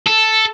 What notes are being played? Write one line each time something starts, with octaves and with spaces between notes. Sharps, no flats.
A4